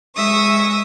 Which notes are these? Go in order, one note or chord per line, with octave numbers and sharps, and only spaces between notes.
G#3 E5 C#6 D#6